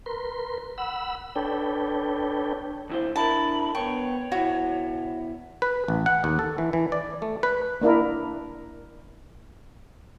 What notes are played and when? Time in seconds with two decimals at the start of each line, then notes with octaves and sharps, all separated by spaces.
0.06 A#4 B4 C6
0.78 F#5 B5 E6
1.36 D4 A4 B4 C#5 G5
2.90 D2 E4 C5
3.16 D4 E4 A#4 A5 B5
3.75 B3 C#5 G5 C#6
4.32 B2 E4 F#4
5.62 B4
5.88 A1
6.06 F#5
6.24 D#2
6.39 A4
6.58 E3
6.73 E3
6.92 D5
7.22 A3
7.43 B4
7.81 A#3 D4 E4 A#4